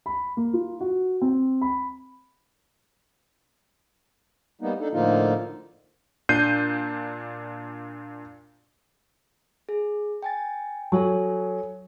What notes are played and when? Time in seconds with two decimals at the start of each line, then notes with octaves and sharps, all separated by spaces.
0.06 B5
0.37 A#3
0.53 F4
0.81 F#4
1.22 C4
1.61 B5
4.61 G3 A#3 B3 D#4
4.80 D4 D#4 A4
4.92 A2 D3 F3 A#3 D#4 F4
6.29 A#2 D4 G6 C7 D#7
9.69 G#4
10.22 G5 G#5 A6
10.92 F#3 A4 C#5 G#5